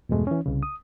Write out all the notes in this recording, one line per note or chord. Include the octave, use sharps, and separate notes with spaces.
E2 G2 B2 G#3 A3
E3 C#4
C2 C#3
D#6